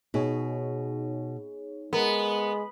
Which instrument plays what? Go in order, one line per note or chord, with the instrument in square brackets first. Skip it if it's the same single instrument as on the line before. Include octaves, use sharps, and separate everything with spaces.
[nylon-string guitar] B2 [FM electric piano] D#4 G#4 C#5
[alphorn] G#3 [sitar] B3 [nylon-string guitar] A#4